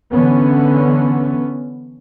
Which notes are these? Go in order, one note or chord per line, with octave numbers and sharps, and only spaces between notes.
D3 E3 B3 C#4